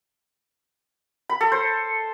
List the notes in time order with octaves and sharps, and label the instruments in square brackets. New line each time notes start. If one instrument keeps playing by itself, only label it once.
[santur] B5
A4
C5